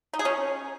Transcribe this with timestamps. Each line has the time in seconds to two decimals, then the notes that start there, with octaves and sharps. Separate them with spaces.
0.13 D#4
0.19 G#4
0.25 C#4